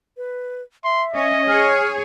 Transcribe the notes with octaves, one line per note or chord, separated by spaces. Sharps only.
B4
E5 C6
C#4 D#5
G#4 C#5 F6